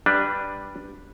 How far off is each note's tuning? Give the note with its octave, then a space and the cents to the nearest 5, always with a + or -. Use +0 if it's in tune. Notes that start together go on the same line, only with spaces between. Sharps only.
G3 +5 D4 +0 B4 +0